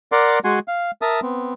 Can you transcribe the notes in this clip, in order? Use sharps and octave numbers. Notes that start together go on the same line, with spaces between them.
A#4 D5 F#5 C6 D6
G#3 F#4 F#5 G#5 C6
F5
A#4 E5 A5 D#6
B3 C4